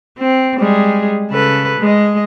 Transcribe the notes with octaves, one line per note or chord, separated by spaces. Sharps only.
C4
G3 G#3 G#4
C#3 A4 B4
G#3 D#5